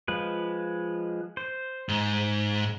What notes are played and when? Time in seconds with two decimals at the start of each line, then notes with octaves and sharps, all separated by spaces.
0.08 F3 G#3 B4
1.37 C5
1.89 G#2